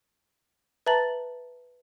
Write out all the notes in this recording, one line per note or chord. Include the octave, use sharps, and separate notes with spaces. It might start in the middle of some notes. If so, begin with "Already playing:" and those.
B4 E5 A5 A#5 A6 F#7